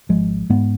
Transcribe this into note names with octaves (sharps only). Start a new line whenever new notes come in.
G#1 F3 G#3
G#2 G#3 B3